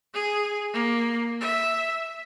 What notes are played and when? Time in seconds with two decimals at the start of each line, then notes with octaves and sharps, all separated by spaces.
0.14 G#4
0.74 A#3
1.41 E5